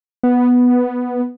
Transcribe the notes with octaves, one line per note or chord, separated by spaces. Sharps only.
B3